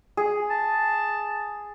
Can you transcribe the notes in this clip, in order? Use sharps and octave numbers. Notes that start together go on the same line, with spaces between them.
G#4
A5